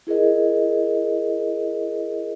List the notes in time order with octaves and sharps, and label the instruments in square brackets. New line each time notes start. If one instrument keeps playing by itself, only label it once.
[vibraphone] E4 G#4 A#4 D#5